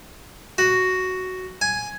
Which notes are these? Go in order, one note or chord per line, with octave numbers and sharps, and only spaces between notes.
F#4
G#5